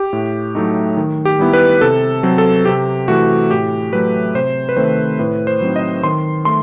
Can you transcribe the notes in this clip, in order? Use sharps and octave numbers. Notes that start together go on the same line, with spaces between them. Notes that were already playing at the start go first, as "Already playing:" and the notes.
Already playing: G4
A2
F#3 A3 D#4
D#3
G4
G3 B3 E4
B4
C3 A4
F#3 C4
A4
C3 G4
E3 A3 F#4
A2 G4
F#3 A3 B4
C3 C5
B4
D#3 A3 C4 C5
A2 B4
C5
F#3 C4 D#4
D#5
D#3 C6
A3 C6